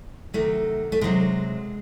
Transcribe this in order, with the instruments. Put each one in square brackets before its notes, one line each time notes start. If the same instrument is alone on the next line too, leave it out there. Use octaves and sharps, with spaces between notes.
[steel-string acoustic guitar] C3 D#3 F#3 A3
A3
C3 D#3 F#3 G#3